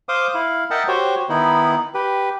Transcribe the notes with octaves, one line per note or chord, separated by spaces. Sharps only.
C5 F5 D6 D#6
E4 F5
A#4 D#5 E5 F#5 G5 A5
F#4 G4 C5 C#5
D#3 B3 D#4 E4
G4 B4